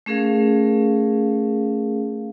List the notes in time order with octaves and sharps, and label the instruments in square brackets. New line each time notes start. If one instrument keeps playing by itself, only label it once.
[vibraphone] A3 C#4 G#4 A#4 F5